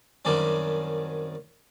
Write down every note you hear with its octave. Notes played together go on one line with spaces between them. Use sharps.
F#2 C3 D#3 G3 D4